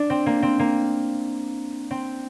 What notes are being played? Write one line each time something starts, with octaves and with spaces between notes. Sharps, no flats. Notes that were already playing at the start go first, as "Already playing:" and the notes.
Already playing: D4
C4
A#3
C4
A#3
C4